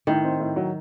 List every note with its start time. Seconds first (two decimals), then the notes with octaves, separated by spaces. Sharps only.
0.07 A2 D#3
0.24 C4
0.40 A2
0.56 F#3